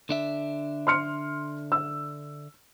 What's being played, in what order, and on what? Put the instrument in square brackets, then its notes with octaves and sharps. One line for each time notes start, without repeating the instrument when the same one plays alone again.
[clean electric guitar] D3 D4 E5
[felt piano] C6 F6 C#7
E6